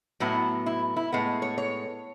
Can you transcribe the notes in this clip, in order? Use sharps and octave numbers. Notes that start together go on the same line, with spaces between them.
A2 F#3 B3 E4
E4
E4
A2 G#3 B3
C#5
C#5